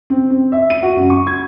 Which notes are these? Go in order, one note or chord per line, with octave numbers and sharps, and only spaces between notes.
C4
C4
E5
D#7
F#4
F#2
C#6
G#6